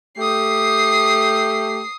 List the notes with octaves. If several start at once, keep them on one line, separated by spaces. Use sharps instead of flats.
A3 G4 D#6 C7